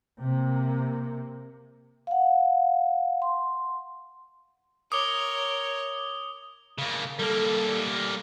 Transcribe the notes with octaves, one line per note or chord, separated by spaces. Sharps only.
C3 A#3
F5 F#5
C6
A#4 C#5 D6 D#6 G7
C#3 A#3
G3 A#3 A4